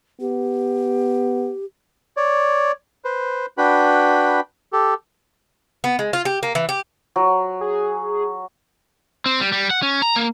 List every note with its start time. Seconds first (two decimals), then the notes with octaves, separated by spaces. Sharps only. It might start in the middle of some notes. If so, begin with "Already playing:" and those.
0.20 B3 G4
2.17 C#5 D5
3.05 B4 C5
3.58 D4 F#4 B4 G5 B5
4.73 G4 A4
5.84 B3
5.99 G#3
6.13 F4
6.25 G4
6.43 A#3
6.55 E3
6.69 G4
7.16 F#3
7.61 G#4
9.26 C4
9.40 G3
9.52 G3
9.71 F#5
9.82 C#4
10.02 A#5
10.16 A#3